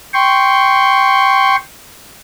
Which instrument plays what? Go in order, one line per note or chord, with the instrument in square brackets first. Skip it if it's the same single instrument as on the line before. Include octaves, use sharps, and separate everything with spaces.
[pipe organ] G5 C6 C#6